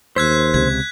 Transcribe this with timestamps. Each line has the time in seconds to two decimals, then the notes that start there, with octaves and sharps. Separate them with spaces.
0.16 D#2 C5 E6 F#6 G#6 B6
0.54 C#2 C3 G#6